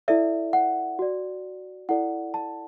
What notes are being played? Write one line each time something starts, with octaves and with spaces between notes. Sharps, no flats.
E4 A4 D5 E5
F#5
F#4 D5
E4 A4 D5 F#5
A5